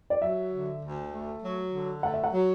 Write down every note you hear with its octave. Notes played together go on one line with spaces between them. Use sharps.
D5
F#3 E5
D3
D2
A3
F#3
D3
A3 F#5
E5
F#5
F#3